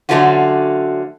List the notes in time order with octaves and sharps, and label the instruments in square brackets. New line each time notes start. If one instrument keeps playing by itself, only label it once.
[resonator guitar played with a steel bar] D3 F#3 A3 C#4 F4 F#4